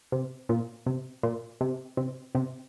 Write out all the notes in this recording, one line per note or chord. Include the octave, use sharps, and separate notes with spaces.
C3
A#2
C3
A#2
C3
C3
C3